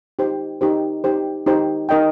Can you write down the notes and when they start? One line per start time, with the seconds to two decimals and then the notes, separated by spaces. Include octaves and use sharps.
0.19 D#4 G4 C5
0.61 D#4 G4 C5
1.04 D#4 G4 C5
1.46 D#4 G4 C5
1.89 D#4 A#4 D#5 G5